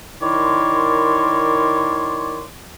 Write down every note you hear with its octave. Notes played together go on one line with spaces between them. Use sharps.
D#3 E4 A#4 C#5 D5 C6